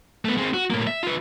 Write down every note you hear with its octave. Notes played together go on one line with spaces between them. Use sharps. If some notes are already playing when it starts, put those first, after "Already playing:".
A3 B3
G#3 C4
F#4
A2 A#3
E5
F4 B4